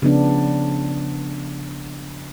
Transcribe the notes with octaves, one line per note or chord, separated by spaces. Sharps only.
C#3 F3 B3 D4